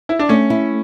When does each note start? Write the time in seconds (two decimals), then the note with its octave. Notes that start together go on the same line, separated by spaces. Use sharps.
0.09 E4
0.19 D4
0.29 A3 C#4
0.50 E4